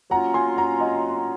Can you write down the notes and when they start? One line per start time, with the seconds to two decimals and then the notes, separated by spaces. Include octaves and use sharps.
0.10 F#3 A#3 C#4 F4 F#5 A#5
0.34 G#5 C6
0.57 F#5 A#5
0.80 D#5 F#5